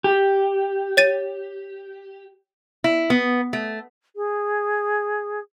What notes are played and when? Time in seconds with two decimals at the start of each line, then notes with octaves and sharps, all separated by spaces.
0.04 G4
0.97 C#5 A6 D#7
2.84 E4
3.10 B3
3.53 A3
4.16 G#4